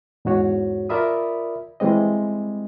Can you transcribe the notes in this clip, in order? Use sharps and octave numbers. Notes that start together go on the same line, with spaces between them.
E2 G#2 F#4 C#5
F4 A#4 D5 E5 B5 D#6
E3 G3 G#3 C4 D#5